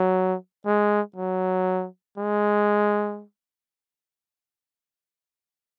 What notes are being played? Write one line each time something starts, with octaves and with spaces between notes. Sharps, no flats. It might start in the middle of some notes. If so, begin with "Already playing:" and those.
Already playing: F#3
G#3
F#3
G#3